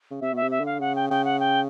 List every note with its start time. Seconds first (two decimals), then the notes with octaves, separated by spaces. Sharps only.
0.11 C#3
0.21 C3 E5
0.32 B2
0.36 E5
0.42 C3
0.51 E5
0.60 D3
0.66 F5
0.80 C#3 F#5
0.96 G5
1.10 C#3 G5
1.25 F#5
1.40 G5